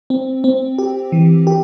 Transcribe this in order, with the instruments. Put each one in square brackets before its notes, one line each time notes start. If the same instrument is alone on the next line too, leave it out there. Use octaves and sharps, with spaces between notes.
[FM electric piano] C4
C4
G4
E3
G4